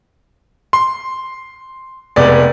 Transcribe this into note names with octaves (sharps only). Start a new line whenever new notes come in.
C6
F1 G#3 B3 D5